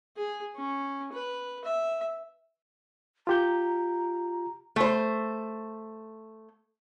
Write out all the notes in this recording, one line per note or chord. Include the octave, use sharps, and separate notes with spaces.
G#4
C#4
B4
E5
F4 G4 A#5 G6
A3 C5